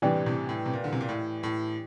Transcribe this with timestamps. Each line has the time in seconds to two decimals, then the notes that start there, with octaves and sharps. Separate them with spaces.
0.02 A2 C3 E3 G3 D4 G4
0.26 A2 C3
0.49 A2
0.66 C3
0.73 A#2
0.84 D3
0.93 C3
1.01 A#2
1.09 A2
1.43 A2